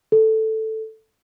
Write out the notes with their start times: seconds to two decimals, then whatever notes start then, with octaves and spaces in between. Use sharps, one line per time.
0.12 A4